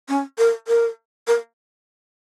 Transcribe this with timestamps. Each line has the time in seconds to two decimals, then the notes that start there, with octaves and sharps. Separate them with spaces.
0.09 C#4
0.38 A#4
0.68 A#4
1.27 A#4